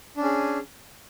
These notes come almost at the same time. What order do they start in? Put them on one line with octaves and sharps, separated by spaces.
D4 C#4 G#4